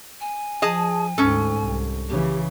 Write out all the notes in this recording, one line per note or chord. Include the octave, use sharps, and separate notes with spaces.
G#5
F3 G#4 D#5 A5
D2 G#2 C#4 A4
C2
C#3 E3 G4